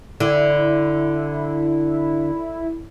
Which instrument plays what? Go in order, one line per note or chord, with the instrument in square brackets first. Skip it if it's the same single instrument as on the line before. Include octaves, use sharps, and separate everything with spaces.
[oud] D3 [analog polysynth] E4